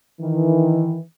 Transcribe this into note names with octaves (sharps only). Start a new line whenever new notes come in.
D#3 E3